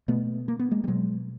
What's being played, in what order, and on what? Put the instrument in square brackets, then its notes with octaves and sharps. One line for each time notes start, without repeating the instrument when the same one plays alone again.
[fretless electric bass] B2 A3 B3
A#3
B3
G#3 A#3
G3
B2 F#3 G#3